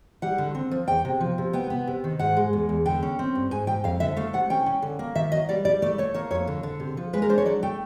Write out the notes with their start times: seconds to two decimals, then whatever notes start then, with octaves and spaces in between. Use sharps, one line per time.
0.22 G3 F#5
0.38 D3
0.55 C4
0.71 F3
0.88 E2 G5
1.05 C3
1.20 F3
1.38 C3
1.53 B3 G5
1.70 B3
1.87 C3
2.04 D#3
2.19 G#2 F#5
2.37 G#3
2.53 E2
2.69 E2
2.86 D3 G5
3.03 C#4
3.19 C4
3.35 G2
3.51 G#2 G#5
3.67 G#2 G5
3.84 F2 F5
4.00 D3 E5
4.17 A3 F5
4.33 C3 F#5
4.50 C#4 G5
4.66 C#4
4.82 D3
4.99 A#3
5.15 D#3 E5
5.32 F#3 D#5
5.49 G3 D5
5.65 G3 D5
5.82 A3 D5
5.98 A3 C#5
6.14 A#3 C#5
6.31 F2 C#5
6.47 D3
6.63 D3
6.80 C3
6.97 F3
7.13 G#3 B4
7.22 A#4
7.29 D4 C5
7.38 C#5
7.45 F#3 D5
7.63 A3 G5